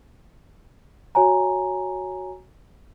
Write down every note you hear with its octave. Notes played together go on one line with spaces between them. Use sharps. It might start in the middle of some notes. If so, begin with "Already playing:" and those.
F#4 C#5 G#5 A#5